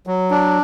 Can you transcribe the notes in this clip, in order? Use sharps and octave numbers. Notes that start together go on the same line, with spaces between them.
F#3
D4